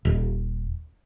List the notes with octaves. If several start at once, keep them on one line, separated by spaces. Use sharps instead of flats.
D#1